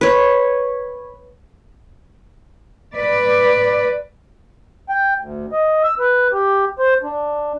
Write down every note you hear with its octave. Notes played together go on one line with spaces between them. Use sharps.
B4 C#5
B4 D5
G5
D2
D#5
E6
B4
G4
C5
D4